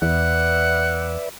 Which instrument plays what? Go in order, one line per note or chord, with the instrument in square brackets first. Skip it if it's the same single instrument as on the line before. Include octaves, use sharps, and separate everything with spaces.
[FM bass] E2 [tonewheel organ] B4 D5 E5 [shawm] F#5